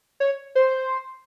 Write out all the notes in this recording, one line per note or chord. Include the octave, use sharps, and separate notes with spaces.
C#5
C5